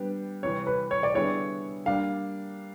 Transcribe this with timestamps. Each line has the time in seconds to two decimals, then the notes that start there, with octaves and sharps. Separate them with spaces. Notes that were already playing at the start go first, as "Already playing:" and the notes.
Already playing: G3 B3 D4 G4 B4
0.43 C3 E3 G3 C#5
0.67 B4
0.91 C#5
1.03 D5
1.14 D3 G3 B3 E4 G#4 C#5
1.86 G3 A#3 D4 F5